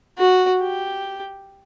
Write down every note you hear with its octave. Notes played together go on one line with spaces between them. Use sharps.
F#4
G4